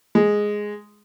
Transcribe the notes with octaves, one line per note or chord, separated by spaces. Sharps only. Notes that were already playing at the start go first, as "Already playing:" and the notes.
G#3